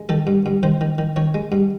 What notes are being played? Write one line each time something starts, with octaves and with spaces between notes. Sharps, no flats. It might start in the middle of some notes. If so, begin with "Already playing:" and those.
Already playing: G#3
D#3 A4
G2
G2
D#3 C5
D#3
D#3
D#3 C#5
G#3
G2